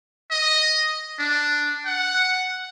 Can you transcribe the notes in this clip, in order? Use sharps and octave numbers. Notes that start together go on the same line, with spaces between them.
D#5
D4
F#5